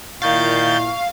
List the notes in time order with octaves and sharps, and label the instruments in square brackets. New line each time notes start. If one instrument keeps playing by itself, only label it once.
[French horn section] A#2 E4 [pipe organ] D#3 G6 A6 [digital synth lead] F5 [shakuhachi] C#6